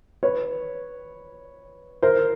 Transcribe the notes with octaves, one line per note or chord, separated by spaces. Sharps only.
B4 C#5
A#4 C5